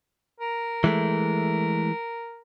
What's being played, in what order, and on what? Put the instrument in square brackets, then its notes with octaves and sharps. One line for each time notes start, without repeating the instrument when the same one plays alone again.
[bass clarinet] A#4
[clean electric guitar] E3 G#3 A3